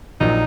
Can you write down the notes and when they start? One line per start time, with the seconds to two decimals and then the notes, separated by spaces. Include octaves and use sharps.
0.21 A#1 A#2 F#3 A#3 D#4